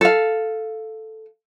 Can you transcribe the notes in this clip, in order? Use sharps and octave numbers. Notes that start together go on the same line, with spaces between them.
A4 F5